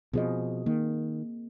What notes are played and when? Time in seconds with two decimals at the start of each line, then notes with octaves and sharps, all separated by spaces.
0.13 B2 F3 C4 G#4 D#5
0.66 D#3 A#3